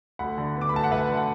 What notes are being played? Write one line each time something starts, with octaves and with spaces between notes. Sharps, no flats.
D2 F#5 B5
D3
B3
D6
B5
D2 A5
F#5
D2 B4 E5
D3
F#5